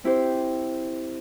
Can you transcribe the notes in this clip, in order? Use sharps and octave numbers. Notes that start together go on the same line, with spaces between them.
C4 E4 G4 C5